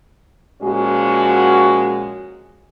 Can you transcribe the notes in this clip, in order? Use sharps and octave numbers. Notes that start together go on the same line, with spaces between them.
A#2 F3 G#3 C#4 F#4